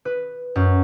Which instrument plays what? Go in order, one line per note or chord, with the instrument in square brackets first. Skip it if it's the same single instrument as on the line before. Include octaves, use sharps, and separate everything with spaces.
[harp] B4
F#2